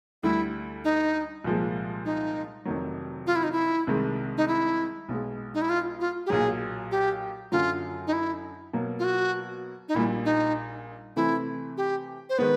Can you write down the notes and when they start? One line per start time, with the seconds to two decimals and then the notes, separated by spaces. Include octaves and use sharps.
0.23 D2 D3 G3 E4
0.84 D#4
1.44 C2 A#2 F3 G#3
2.05 D#4
2.65 F1 F2 C3 D#3 F#3
3.27 F4
3.36 E4
3.44 D#4
3.52 E4
3.87 C2 C3 D#3 G#3
4.37 D#4
4.48 E4
5.09 B1 B2 G#3
5.54 D#4
5.62 E4
5.70 F4
6.00 F4
6.26 G4
6.30 B1 A#2 F#3 G#4
6.91 G4
7.52 F#2 D3 F#3 F4
8.07 D#4
8.13 E4
8.73 B2 F#3 A#3
8.99 F4
9.04 F#4
9.88 D#4
9.95 A#1 A#2 G3 E4
10.25 D#4
11.16 C3 E3 A3 C4 E4
11.77 G4
12.29 C5
12.38 D#3 G#3 B3 B4